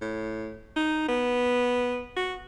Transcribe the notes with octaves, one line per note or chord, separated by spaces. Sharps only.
A2
D#4
B3
F#4